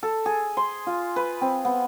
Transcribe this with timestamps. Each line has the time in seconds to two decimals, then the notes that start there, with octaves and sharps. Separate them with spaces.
0.03 A4
0.26 G#4
0.57 C6
0.87 F4
1.16 B4
1.41 C4
1.65 B3